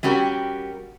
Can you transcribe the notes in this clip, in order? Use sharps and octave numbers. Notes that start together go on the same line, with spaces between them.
G3 C#4 F#4 G4 A#4